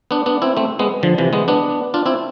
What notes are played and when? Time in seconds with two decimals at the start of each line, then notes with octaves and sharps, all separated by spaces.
0.11 B3 D4
0.26 B3 D4
0.42 C4 E4
0.57 A3 C4
0.79 G#3 B3
1.03 D3 F3
1.18 C3 E3
1.33 G#3 B3
1.48 B3 D4
1.94 D4 F4
2.06 C4 E4